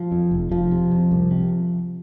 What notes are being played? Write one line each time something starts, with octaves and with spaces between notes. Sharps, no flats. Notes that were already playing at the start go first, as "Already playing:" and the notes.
Already playing: F3
F2
F1
F1 F3
C3
F2
C2
C3